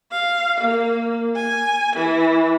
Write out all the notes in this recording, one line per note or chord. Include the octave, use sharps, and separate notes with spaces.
F5
A#3
G#5
E3